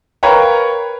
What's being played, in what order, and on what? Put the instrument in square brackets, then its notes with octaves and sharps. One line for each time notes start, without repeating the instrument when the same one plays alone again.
[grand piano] A#4 B4 C#5 F5 G5 A#5